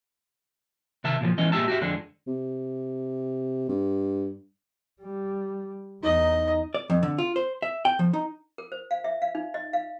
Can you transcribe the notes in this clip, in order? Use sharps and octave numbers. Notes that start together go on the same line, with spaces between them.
C3 D#3 E5 A5
A#2 C#3 E3 F3
E3 G#3 C#4 D#5
A#2 G#3 F4 G4 E5 A5
F#4 G4 E5
F2 D3 G#3 D4
C3
G2
G3
E2 D#4 D#5
D5
F2
D3
F4
C5
E5
G5
F3
D#4
A#4
C5
F5
E5
F5
D#4
D#5
F5